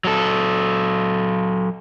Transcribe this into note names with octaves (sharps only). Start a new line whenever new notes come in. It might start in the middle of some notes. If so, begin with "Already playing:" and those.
F#3 A4